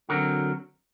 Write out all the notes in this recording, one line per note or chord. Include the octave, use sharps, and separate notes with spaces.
D3 F#3 C4 F#4 A#4